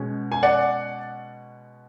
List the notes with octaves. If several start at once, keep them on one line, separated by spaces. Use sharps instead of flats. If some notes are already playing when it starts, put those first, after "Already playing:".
Already playing: B2 G#3 C#4
G#5
D5 F#5